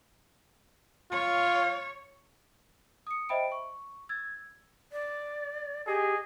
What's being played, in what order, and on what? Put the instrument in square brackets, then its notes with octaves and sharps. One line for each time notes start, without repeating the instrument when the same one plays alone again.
[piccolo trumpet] F4 [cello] C#5
[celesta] D#6 C#7
C5 D#5 E5 G5 B5 D7
C#6
E6 G#6 A6
[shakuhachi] D5
[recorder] G4 [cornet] G#4 [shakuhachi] D#5